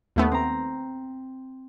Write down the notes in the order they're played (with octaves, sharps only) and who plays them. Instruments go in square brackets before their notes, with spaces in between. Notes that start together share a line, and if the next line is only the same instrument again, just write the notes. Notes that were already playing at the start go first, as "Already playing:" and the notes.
[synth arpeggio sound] D#2 A3 B3
[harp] C4 A#5